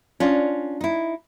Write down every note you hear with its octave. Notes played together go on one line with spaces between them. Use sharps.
C#4 D4 F4
D#4 E4